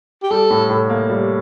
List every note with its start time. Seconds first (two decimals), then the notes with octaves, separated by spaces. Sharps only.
0.23 G4
0.31 G3 A4
0.51 A2
0.70 A2
0.90 A#3
1.10 G3